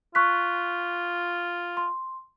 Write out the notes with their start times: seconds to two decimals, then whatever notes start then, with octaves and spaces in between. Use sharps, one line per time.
0.15 F4 C#6 F#6 B6
1.77 C6